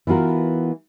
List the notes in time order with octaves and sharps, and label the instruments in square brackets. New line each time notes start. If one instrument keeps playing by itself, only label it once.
[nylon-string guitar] E3 B3 F4 F#4 A#4